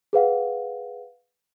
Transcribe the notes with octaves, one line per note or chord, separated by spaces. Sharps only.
G#4 B4 F5 F#5